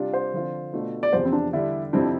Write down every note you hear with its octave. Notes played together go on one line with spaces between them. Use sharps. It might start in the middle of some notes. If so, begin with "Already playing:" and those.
Already playing: C3 G3 D4 F4
C5
D3 F3 C4 F4
B2 A3 D4 F4
D5
E2 C3 F3 C5
C4
D4
D3 G3 D4 E4
F2 C3 F3 C4 D4 E4